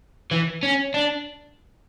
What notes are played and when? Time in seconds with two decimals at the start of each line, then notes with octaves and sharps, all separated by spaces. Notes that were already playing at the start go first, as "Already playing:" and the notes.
0.31 E3
0.63 C#4
0.94 D4